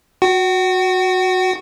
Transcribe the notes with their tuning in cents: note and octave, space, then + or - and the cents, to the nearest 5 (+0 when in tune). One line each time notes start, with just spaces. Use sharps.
F#4 -15 F#5 +35